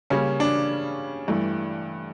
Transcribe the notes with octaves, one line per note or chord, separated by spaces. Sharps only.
C#3 G3 A#3 C#4
D4
G2 E3 A3